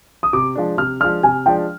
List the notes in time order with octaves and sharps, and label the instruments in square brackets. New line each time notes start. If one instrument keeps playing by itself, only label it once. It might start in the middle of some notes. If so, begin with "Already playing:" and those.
[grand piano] D#6
[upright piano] C3 [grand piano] D6
[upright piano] F3 G#3 D4
[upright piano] C3 [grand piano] F6
[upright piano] F3 G#3 D4 [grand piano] F6
[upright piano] C3 [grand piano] G#5
[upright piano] F3 G#3 D4 [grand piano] G5